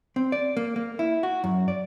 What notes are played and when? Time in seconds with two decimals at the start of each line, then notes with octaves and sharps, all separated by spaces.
0.16 C4
0.32 D5
0.57 A#3
0.76 A#3
0.99 E4
1.23 F#4
1.44 F#2
1.68 D5